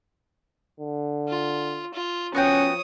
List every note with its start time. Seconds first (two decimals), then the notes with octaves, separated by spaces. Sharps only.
0.80 D3
1.29 F4
1.94 F4
2.35 F3 B3 C#4 F#4 C#5 G5 D#6